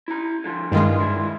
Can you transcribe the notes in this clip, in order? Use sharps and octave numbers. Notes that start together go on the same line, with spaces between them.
E4 A#5
D3 F3 F4
G2 D#3 G#3 E4 F5 C6
C2 E4 F4